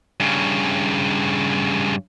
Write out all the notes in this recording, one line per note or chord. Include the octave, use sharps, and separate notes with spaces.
G2 C#3